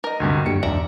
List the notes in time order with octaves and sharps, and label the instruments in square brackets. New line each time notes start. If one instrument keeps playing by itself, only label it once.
[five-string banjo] A#4 D#5
[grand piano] D2 G2 C3
[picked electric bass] F#2 A#3 [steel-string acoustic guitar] D3 G4 [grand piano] C#7
[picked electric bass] B1 E2 [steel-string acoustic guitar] G#2 F3 D4 [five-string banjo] D5 E5 A#5